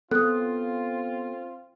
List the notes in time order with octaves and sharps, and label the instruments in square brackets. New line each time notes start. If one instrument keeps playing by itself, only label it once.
[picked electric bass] B3 [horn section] C4 F4 [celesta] A4 [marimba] D#6 F#6